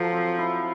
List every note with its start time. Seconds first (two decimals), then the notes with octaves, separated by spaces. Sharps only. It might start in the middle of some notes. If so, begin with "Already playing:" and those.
Already playing: F3 F#3 A4
0.12 C4
0.38 E4